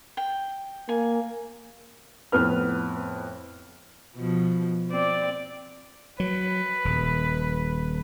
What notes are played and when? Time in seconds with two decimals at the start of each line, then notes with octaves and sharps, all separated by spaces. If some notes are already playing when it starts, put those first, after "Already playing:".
0.17 G5
0.89 A#3 G#5
2.32 F2 A2 B3 B4 F6
4.16 B2 F3
4.90 C4 D5
6.20 F#3 B4
6.85 D#1